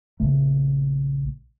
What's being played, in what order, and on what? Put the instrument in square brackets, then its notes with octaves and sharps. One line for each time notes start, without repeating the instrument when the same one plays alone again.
[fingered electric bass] A#1 C#3 A3